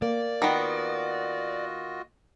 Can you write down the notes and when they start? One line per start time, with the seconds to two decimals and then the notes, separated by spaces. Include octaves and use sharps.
0.02 A#3 D5
0.42 D#3 B3 F4 F#4 D#5